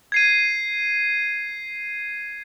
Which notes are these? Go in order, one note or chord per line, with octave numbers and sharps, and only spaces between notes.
G#6 C7 D#7